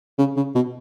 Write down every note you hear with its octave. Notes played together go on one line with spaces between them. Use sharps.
C#3
C#3
B2